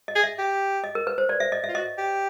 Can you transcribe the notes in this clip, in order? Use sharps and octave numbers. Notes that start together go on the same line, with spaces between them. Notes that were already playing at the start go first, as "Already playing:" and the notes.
D#5
G#4
E5
G4
D#5
A#4
B4
C5
D5
E5
D#5
E5
F4
F#4 D#5
G4